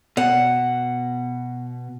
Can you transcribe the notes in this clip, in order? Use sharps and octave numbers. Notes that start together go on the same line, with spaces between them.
B2 F#5